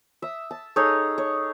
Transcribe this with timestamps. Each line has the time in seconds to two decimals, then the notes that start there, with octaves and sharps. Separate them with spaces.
0.22 E5 D#6
0.51 A5
0.76 D#4 G#4 A4 C#5
1.18 C#5